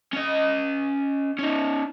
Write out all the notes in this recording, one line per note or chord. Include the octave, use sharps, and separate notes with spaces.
C#4 D#5
C#4 D#4